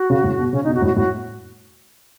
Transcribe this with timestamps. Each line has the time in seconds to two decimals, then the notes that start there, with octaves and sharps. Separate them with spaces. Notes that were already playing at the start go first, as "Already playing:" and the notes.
Already playing: F#4
0.10 C#3
0.24 A2
0.38 B2
0.53 C#3 C#4
0.64 B2 D#4
0.74 F#4
0.77 B2
0.82 A2
0.86 F#4
0.96 A2 F#4